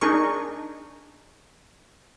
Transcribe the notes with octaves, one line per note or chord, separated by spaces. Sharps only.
D4 D#4 G#4 A#4 C#6